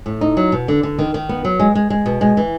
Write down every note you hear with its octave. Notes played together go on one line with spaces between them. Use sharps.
A2
D#4
F#3
B2
D3
D3
D#3
D#3
B3
F#3
G#3
G#3
G#3
B2
G#3
E3